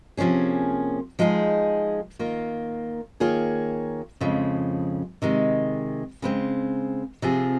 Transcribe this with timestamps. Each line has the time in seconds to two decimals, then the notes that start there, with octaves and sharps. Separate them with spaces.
0.17 C3 F3 A#3 C#4 G#4
1.19 F3 G#3 D#4 G#4
2.19 D#3 A#3 F4
3.20 D#3 A#3 F4 G#4 C#5
4.20 F2 C#3 F3 G#3
5.22 C3 D#3 G#3
6.22 C#3 G#3 C4
7.22 C3 F3 C4 F4 G#4